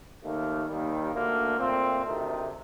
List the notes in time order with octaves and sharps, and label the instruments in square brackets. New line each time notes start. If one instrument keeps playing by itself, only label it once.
[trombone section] D#2 D#3 A3 A#3
D#2 D#3 G3 A#3
D2 D3 A3 A#3
A#2 A3 C4
D2 C3 D#3 A3